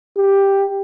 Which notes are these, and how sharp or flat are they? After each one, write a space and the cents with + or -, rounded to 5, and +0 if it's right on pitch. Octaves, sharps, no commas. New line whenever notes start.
G4 +5